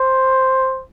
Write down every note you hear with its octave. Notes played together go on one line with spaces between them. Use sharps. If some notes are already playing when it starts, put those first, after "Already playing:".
Already playing: C5